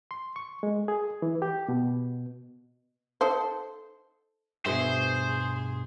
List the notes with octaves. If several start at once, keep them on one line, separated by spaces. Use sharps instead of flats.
C6
C#6
G#3
G#4
E3
G4
B2
D#4 A4 C5
G2 B2 F#4 G#4 B4 C5 E5